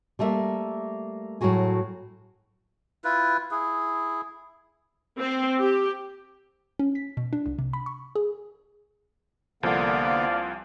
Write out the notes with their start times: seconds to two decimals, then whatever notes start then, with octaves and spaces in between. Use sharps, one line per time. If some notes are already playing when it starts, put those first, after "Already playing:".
0.19 G3 A3 A#3 E5
1.41 A2 F#3 G#3 F#4 G#4
3.04 E4 F4 B4
3.51 E4 G#4
5.19 C4
5.58 G4
6.79 C#4
6.95 B6
7.17 B2
7.33 D4
7.46 C2
7.59 C3
7.73 B5
7.86 C#6
8.15 G#4
9.63 C2 D3 F3 A#3 B3 D5 F5